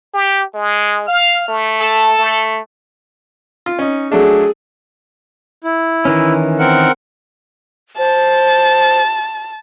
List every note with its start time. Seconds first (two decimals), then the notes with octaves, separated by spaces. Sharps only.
0.14 G4
0.54 G#3
1.08 F5 F6
1.48 A3
1.81 A4 A5
2.19 A3
3.66 F4
3.79 C#4 D#4
4.12 F#3 A3 D4 G#4
5.64 E4
6.05 D#3 E3 C#4
6.59 C4 A#4 F#5
7.98 C5 A5